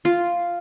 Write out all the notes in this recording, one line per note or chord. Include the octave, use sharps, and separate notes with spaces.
F4